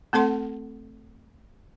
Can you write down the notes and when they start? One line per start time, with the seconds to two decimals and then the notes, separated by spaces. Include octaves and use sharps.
0.13 A3 C4 A4 F#5 C6